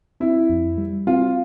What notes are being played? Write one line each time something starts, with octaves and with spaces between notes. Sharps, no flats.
C4 E4
F2
G3
C4 F4